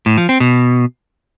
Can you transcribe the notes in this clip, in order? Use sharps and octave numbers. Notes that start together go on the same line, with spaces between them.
A2
F3
C4
B2